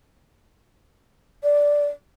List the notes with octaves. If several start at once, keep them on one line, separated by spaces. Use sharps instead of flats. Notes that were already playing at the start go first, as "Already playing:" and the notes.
D5